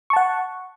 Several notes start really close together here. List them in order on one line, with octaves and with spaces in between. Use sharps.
C#6 A5 F#5